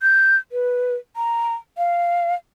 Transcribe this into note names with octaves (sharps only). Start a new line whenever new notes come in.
G6
B4
A#5
F5